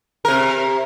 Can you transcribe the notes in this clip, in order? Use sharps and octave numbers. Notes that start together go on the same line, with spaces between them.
C3 A#4